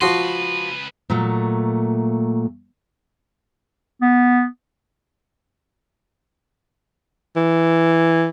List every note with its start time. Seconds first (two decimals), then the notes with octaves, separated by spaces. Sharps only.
0.01 C#2 F3 F#4 B4 C6
1.10 A#2 F#3 A3
4.02 B3
7.36 E3